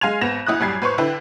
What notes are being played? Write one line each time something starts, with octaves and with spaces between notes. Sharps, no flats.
G#3 F5 G#5 C6 G#6 F7
G#1 B3 A#6 E7 F7
D2 E4 D#6 F#6
A1 F#2 G3 G#6 C7
A1 B4 C5 C#6
D3 E4 B4 G5